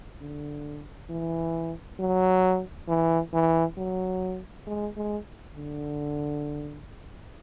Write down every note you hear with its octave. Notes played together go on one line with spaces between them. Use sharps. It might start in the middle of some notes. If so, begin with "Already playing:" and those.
D3
E3
F#3
E3
E3
F#3
G#3
G#3
D3